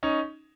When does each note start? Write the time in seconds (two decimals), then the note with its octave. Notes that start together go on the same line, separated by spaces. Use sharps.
0.03 C#4 D#4